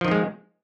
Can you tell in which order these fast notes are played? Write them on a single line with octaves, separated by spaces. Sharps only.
F3 D#3 C4 G#3